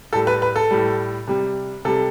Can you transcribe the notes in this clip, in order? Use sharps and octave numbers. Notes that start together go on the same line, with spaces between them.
A2 G3 A4
B4
B4
A4
A2 G3
C3 G3
C3 G3 A4